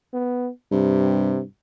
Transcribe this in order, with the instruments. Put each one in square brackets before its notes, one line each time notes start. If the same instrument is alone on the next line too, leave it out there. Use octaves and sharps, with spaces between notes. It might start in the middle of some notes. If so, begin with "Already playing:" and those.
[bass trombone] B3
[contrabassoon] G2 [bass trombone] C3